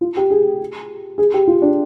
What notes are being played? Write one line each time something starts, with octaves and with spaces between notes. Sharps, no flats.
F4
G4
G#4
G#4
G4
F4
D4